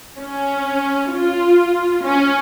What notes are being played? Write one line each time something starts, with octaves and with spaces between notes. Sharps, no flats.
C#4
F4
C#4